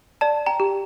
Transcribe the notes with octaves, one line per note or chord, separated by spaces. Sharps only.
D5 A5
G5 A#5
G4